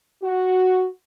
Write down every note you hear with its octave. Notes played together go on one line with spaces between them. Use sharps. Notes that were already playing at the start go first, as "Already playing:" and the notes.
F#4